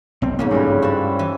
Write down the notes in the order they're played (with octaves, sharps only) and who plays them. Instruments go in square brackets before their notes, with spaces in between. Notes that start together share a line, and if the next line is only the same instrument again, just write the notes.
[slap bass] B1 C4
[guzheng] F2 G#2 C#4 [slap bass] A#3
[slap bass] G2 [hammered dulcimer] C#3 G3 E4
[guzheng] F#4 A5 [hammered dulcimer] C5 C#5 B5
[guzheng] E3